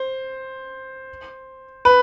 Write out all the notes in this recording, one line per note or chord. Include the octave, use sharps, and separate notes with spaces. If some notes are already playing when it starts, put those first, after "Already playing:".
Already playing: C5
B4